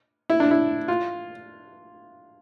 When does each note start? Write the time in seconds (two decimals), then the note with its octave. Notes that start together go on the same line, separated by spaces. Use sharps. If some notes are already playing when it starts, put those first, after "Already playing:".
0.30 E4
0.40 D4
0.51 E4
0.88 F4